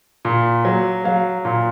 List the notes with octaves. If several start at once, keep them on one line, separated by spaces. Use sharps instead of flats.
A#2
F#3
F#3 F5
A#2